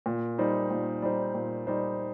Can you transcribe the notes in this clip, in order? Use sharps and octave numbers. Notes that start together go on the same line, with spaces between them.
A#2
G3 D#4 C5
A#2
G3 D#4 C5
A#2
G3 D#4 C5